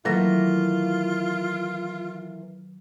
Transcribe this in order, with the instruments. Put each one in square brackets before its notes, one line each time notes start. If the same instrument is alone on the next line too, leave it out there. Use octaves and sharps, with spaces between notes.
[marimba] D#3 F#3 A#6 [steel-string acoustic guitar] E3 A3 A#3 [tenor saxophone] F4